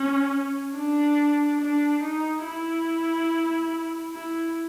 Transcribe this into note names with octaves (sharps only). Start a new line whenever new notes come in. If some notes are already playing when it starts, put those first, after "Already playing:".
Already playing: C#4
D4
D4
D#4
E4
E4